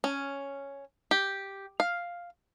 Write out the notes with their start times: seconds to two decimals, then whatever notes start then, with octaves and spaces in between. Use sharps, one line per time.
0.04 C#4
1.11 G4
1.80 F5